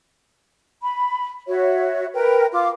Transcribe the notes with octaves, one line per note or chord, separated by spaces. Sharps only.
B5
F#4 C#5 E5
A#4 B4 G5
F4 D6